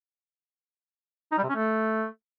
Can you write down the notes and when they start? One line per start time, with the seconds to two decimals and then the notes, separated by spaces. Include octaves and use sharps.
1.32 D#4
1.38 G3
1.43 C3
1.49 C#4
1.55 A3